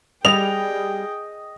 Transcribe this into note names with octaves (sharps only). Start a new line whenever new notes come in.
G3 G#4 D#5 G5 F7